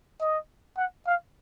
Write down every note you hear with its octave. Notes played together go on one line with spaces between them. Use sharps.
D#5
F#5
F5